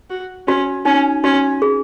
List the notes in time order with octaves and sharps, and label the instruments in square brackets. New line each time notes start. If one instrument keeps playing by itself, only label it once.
[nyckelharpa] F#4
[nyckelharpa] C#4 [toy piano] F#4
[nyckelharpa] C#4 [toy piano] D#4
[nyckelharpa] C#4 [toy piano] F#4
[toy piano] G#4